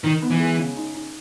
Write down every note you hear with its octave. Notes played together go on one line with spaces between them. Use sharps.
D#3 D#4
B3
E3
G#3
C#3
D#4
D#4